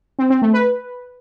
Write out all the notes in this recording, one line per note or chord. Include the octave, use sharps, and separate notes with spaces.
C4
C4
A3
B4